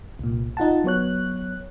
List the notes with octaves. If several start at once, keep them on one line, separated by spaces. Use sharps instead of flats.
C2 A#2
D#4 F4 F#5 A5
F#3 B3 C#5 F#6